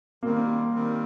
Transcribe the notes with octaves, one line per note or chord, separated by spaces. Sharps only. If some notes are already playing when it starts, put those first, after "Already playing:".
D#3 G3 A#3 C4
D#3 G3 C4